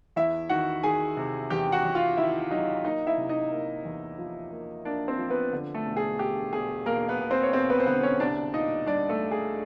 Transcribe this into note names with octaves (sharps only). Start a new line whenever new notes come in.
E2 E4 E5
D#3 F#4 F#5
D#3 G#4 G#5
C3
E2 G4 G5
F#4 F#5
E2
F4 F5
D#3 E4 E5
F#3 D#4 D#5
A#3 D#4 D#5
E4 E5
C3
D#4 D#5
A#3
E2
F3
A#3
A#3 D4 D5
C4 C5
F3
B3 B4
D3
A3 A4
E1
G#4
E1 G4
E1 G#4
E1 A#3 A#4
B3 B4
E1
C4 C5
C#5
E1 C4 C5
B3 B4
C5
D3 B3 B4
C#4 C#5
C2 D4 D5
A#2 D#4 D#5
G3 D4 D5
A3 A4
G3
G#4